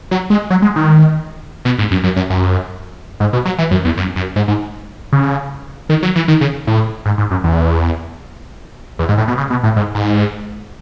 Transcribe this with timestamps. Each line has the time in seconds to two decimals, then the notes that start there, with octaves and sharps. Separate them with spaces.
0.11 F#3
0.30 G#3
0.50 F#3
0.62 G#3
0.76 D#3
1.65 B2
1.79 G#2
1.91 F#2
2.04 F#2
2.16 F#2
2.30 F#2
3.20 G#2
3.33 B2
3.45 F#3
3.58 E3
3.71 F#2
3.85 E2
3.97 F#2
4.16 F#2
4.36 G#2
4.48 G#2
5.12 C#3
5.89 D#3
6.03 F#3
6.16 E3
6.28 D#3
6.41 C#3
6.67 A2
7.05 G#2
7.18 G#2
7.31 F#2
7.44 E2
8.99 E2
9.09 G#2
9.18 A2
9.28 B2
9.38 C#3
9.50 B2
9.63 A2
9.76 G#2
9.95 G#2